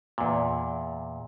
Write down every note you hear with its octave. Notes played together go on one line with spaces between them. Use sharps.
E2 A#2